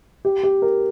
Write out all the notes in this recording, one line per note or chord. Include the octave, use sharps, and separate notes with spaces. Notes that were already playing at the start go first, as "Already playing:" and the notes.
G4
G4
A#4